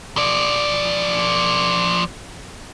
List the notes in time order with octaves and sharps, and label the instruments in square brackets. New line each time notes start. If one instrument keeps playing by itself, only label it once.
[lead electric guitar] F3 D5